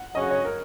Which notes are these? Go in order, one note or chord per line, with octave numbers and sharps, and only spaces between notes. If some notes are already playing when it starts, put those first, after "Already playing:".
Already playing: F#5
C#3 F#3 C#4 F#4 D#5
C#5
A#4